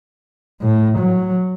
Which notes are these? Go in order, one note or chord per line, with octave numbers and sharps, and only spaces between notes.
A2
F#3